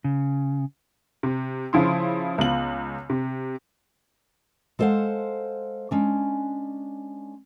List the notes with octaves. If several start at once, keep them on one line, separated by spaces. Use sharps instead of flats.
C#3
C3
C#3 F3 E4 C6
C#2 B3 F4 F#7
C3
G#3 A4 C5 D5 F5 F#5
G#3 C#4 D4